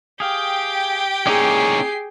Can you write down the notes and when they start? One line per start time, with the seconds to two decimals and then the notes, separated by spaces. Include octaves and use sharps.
0.20 G4 G#4 F5 G5
1.27 A#3 C#4 D#4 E4 G#4 D5 C7